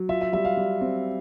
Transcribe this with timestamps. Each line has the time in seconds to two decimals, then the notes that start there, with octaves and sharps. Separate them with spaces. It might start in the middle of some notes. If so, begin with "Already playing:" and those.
Already playing: F#3
0.09 F4 E5
0.21 E5
0.33 G3 E5
0.45 F5
0.57 G3
0.81 C4